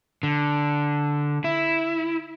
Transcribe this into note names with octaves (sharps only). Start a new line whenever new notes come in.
D3
E4